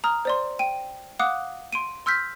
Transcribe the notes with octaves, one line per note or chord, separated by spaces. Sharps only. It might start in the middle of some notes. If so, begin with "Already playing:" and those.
A#5 D#6 F6
C5 D5 C6
G5 D#7
F5 F#5 D6 D#6 F#6
C6 D7 D#7
C6 E6 F6 G6 B6